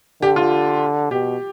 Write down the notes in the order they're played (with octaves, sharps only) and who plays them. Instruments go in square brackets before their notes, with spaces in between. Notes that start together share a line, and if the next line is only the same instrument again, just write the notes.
[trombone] D3 [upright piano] G4
[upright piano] F4
[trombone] B2 [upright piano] G4